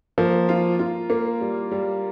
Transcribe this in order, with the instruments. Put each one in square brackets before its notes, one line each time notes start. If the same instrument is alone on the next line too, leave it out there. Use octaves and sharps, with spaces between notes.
[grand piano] F3 [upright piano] A#3
[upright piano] F4
F4
A#3
G3
G3